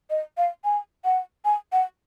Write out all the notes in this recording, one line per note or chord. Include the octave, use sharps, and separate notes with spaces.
D#5
F5
G#5
F#5
G#5
F#5